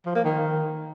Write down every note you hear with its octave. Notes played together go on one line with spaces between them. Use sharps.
F3
A#3
D#3